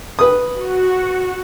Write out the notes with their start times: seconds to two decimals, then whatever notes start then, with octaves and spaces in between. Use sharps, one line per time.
0.19 B4 D#6
0.58 F#4